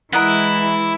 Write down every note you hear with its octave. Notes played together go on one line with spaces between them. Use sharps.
E3 G#3 E4 A#4 D#5 F#5